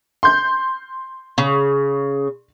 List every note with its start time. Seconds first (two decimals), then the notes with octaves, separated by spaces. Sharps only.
0.23 C6 G6
1.38 C#3